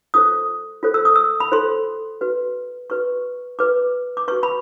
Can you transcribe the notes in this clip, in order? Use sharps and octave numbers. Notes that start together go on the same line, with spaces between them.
F4 A4 C5 D#6
F4 A4 C5
E6
D#6
E6
B5
F4 A4 C5 C6
F#4 B4
F#4 B4 C#6
F#4 B4 D6
D6
F#4 B4 C#6
B5